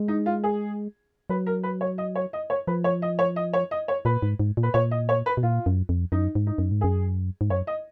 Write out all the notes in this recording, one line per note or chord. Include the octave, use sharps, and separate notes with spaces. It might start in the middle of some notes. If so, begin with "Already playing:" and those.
Already playing: G#3
D#4
F4
G#4
F#3 B4
A#4
B4
C#5
D#5
C#5
D#5
C#5
F3 B4
C#5
D#5
C#5
D#5
C#5
D#5
C#5
A#2 B4
G#2
G#2
A#2
B4
A#2 C#5
D#5
C#5
B4
B2
A#2 F4
F#2
F2
F#2 D#4
G#2
D#4
F#2
G#2
F#2 G#4
G#2
F#2 C#5
D#5